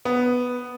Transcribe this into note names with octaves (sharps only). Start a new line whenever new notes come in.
B3